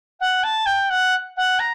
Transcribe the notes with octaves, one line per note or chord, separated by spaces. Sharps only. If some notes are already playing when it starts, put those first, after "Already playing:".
F#5
A5
G5
F#5
F#5
A#5